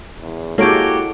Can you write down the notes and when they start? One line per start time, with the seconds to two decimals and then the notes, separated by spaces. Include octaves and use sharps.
0.21 E2
0.58 G#3 A#3 E4 F#4 G4 A4 C#5 D7